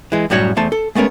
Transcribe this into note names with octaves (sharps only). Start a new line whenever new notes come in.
E3 G#3
F#2 A2 G3 F#4 C#5
E2 A3 C5 A5
A4
G#3 A3 B3 C#4 A#4